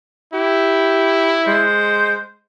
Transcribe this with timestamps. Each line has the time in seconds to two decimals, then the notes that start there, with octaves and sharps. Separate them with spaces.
0.34 E4 G4
1.47 G#3 C5